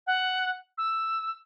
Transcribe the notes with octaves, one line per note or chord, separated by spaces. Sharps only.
F#5
E6